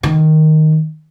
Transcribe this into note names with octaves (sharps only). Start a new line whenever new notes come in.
D#3